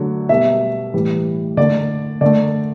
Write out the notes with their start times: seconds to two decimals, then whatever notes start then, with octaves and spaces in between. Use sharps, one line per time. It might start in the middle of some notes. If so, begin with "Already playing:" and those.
Already playing: D3 F#3 A3
0.29 B2 G3 E5
0.93 A2 E3 G3
1.57 D3 A3 D5
2.21 D3 A3 D5